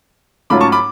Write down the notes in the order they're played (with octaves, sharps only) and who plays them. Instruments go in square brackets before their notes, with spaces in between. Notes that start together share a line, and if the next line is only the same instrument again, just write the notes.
[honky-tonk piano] G#2 F#3 A3 C#4 F4 [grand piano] B5 D6
[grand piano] A5 C#6
B5 D6